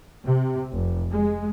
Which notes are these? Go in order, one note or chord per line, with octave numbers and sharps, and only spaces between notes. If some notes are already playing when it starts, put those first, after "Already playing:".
C3
F1
G#3